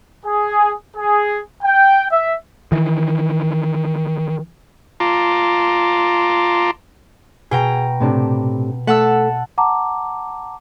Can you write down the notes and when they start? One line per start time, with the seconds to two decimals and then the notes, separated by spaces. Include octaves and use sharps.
0.25 G#4
0.96 G#4
1.63 G5
2.12 E5
2.72 D#3 E3
5.00 F4 A5 A#5 C6 D6
7.51 B2 G#4 G5 A#5
8.00 A2 C3 D4
8.87 A3 F#5 A5 E6
9.58 F#5 A5 A#5 D6